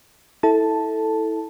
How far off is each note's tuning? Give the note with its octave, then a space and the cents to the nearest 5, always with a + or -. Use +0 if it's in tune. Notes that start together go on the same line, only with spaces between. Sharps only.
E4 -20 A4 +0 A5 +0